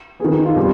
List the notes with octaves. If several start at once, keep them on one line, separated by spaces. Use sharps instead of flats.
D#3 B3 G#4
F4
B2 G3 C4 G4